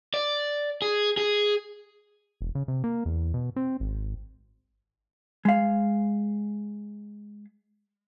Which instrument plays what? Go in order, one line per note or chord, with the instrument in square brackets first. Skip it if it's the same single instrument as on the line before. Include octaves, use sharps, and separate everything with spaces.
[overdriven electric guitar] D5
G#4
G#4
[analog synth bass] E1
C#3
C3
A#3
E2
B2
C4
G#1
[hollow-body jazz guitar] G#3 F5